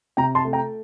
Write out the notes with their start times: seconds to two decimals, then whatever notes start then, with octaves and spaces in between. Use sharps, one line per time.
0.17 C3 G5 A#5
0.35 A5 C6
0.45 A3
0.53 G5 A#5